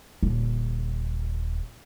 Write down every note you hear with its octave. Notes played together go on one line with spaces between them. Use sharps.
D#1 D3